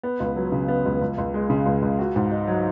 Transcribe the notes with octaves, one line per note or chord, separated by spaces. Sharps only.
B3
C#2
F#3
C#3
B3
C#2
C#2
C#2
G#3
C#3
C#2
C#2
F#4
G#2
D#4
F#3